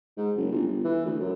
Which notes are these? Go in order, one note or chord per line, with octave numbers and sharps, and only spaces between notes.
G#2
F#1
G1
G1
E3
D2
F#2